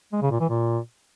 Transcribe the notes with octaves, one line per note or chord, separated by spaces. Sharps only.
G#3
C#3
A#2
E3
A#2